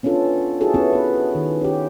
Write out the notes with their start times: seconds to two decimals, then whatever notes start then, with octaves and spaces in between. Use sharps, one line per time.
0.03 B3 C#4 D4 F4 A4
0.61 E4 F#4 G#4 A4
0.74 B3 C#4 E4
0.93 B3 B4
1.35 D#3
1.61 C#4 G4